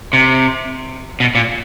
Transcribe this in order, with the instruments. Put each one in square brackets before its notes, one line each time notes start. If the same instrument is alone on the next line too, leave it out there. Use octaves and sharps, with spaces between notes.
[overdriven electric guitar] C3
B2
A#2